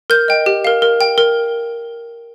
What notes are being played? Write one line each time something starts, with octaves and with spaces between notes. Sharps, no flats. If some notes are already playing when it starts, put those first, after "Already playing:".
A#4 G6
D#5 G5
G4
A#4 F5
A#4
G5
A#4